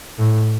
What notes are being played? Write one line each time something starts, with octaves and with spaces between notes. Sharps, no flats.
A2